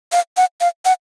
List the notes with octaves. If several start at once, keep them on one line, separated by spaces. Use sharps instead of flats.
F5
F#5
F5
F#5